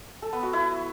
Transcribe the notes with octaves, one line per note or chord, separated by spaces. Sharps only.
A4
B3
F#4
E4